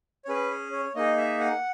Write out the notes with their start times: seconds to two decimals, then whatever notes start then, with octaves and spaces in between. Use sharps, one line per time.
0.25 C#5
0.28 C#4 G#4 B4
0.51 C#5
0.72 C#5
0.95 A#3 D#4 G#4 D#5
1.17 E5
1.40 F#5